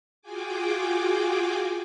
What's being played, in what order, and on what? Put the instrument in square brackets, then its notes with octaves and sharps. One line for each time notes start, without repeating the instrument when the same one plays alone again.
[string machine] F4 F#4 G#4 G5 G#5 D6